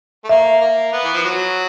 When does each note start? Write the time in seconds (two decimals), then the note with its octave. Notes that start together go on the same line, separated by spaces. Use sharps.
0.24 A3
0.29 A#3 E5
0.61 A#3
0.93 B3
1.04 E3
1.14 F3
1.24 F#3